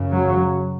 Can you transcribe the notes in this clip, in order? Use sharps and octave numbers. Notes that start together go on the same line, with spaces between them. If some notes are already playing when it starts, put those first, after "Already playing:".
Already playing: F#2 C#3
F#3